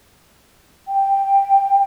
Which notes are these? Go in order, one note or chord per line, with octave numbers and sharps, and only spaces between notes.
G5